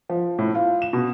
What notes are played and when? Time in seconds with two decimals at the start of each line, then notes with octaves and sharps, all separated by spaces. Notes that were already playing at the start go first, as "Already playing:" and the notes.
0.09 F3
0.39 A2
0.55 F4
0.82 E7
0.93 B2